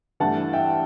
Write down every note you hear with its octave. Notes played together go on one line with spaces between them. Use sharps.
G2 E3 A3 E4 F#5 A5
E5 G5